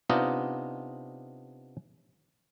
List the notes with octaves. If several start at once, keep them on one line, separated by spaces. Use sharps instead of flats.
C3 B3 D4 D#4 F4 D#5